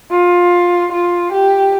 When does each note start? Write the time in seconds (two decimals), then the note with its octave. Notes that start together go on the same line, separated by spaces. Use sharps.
0.11 F4
0.92 F4
1.33 G4